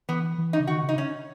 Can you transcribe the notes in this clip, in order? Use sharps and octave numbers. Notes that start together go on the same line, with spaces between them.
E3 B3
E3
D#4
C#3
D#3 F#4
C#3
D#4
C#4